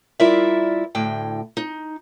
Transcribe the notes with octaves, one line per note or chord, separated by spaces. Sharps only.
G3 E4 F4 A#4 D5 E5
D2 A2 G5
D#4